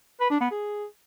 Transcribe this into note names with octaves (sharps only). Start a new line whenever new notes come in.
B4
D4
B3
G#4